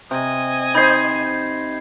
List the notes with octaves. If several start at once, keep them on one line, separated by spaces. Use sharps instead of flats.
C3 D#5 G#5
D#4 C5 B5 G#6 C7